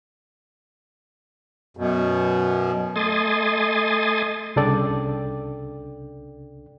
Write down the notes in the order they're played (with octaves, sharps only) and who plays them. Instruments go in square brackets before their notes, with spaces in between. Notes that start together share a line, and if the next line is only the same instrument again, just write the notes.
[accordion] F#2 B2
[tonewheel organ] A3 D#5 G#5 C6 D#6 A6
[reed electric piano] C2 C#3 D4 A4 D5 G5